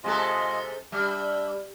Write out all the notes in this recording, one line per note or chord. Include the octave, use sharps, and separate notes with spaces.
C3 G#3 F4 G#4 A4 D#5
G3 D4 E5